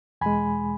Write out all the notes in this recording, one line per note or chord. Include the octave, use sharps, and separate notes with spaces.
E2 B2 G#3 G#5 B5